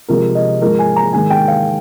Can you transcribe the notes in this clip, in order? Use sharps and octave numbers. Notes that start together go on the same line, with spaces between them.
C3 F3 G#3 A#4
D#5
G#2 F3 G#3 A#4
G#5
A#5
G#2 D#3 G#3 G#5
G5
F5